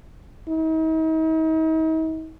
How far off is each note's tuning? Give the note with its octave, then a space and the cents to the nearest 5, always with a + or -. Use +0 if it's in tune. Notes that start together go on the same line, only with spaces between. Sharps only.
D#4 +45